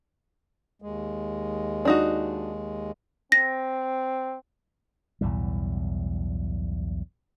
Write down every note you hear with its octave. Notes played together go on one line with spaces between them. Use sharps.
D#2 G#3
D4 D#4 F#4
C4 A#6
B1 E2 A2 G3